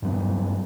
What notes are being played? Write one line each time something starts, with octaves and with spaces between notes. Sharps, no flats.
G2 F#3 B3